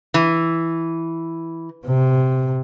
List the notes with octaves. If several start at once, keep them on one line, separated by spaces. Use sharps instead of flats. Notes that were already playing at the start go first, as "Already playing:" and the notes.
E3
C3